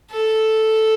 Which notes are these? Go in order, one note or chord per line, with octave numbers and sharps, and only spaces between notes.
A4